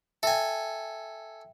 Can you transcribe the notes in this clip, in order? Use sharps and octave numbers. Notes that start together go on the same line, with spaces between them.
A4 E5 G5 G#5